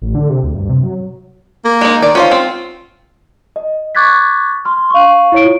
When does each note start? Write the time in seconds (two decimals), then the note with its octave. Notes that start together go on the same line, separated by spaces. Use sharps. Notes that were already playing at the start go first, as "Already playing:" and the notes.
0.02 A1
0.15 D3
0.30 C3
0.43 D2
0.55 G2
0.69 C3
0.83 F#3
1.65 A#3
1.81 G#3 D#4
2.02 D#3 D5
2.15 C#4 F4 C5 F5
2.31 C4
3.56 D#5
3.95 C#6 D6 F#6 G#6 A6 B6
4.65 C6 F6
4.90 F5 C#6
5.32 E4 C#5 D7
5.45 F4